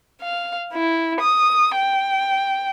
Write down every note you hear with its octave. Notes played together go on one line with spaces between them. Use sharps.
F5
E4
D#6
G5